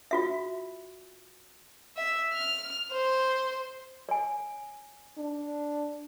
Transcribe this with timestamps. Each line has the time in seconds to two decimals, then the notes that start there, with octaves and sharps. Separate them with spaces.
0.11 F4 F#4 E5
1.97 E5
2.33 F6
2.92 C5
4.09 C#5 G#5
5.17 D4